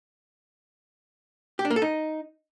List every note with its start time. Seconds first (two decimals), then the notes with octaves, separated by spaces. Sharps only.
1.59 G4
1.65 D4
1.70 A#3
1.76 A4
1.82 D#4